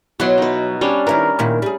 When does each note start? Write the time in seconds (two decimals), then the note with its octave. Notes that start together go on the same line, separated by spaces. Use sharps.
0.20 B2 F#3 E4 F#4 C6
0.38 D#4 B4
0.81 G3 C#4 D4
1.07 D#3 E4 A#4 B4
1.39 A#2 D#3 E4
1.62 G3 G#4